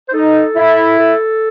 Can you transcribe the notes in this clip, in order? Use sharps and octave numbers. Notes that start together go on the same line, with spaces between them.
C5
D#4 A4
E4
A4